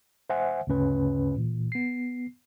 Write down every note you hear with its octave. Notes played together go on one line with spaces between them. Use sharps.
C5 E5 F#5 G#5
D2 G2 C#3 C#4 B4
A#2 E3
B3 C7